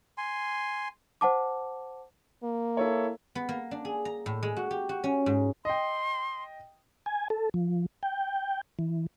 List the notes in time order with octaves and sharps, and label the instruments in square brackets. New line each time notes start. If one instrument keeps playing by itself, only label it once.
[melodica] G#5 C6
[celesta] C5 F#5 A5 D6
[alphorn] A#3
[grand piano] E4 A4 C#5
[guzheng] B3
A#3
D4
G#4
A#5
A2
G#3
F#4
G4
F#4
C#4
G#2
[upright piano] D#5 G5 [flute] C6
[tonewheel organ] G#5
A4
F3
G5
E3